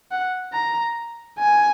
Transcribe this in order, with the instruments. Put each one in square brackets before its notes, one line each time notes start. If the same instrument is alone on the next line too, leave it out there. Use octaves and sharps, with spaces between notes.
[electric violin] F#5
A#5
G#5